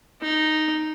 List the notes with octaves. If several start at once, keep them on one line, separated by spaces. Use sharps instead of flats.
D#4